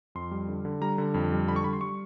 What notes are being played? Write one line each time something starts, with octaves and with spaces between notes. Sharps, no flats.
F2 C6
G3
D3
D3
G3 A#5
D3
F2
G3
D3 B5
C#6
G3 B5
C6
G3 C#6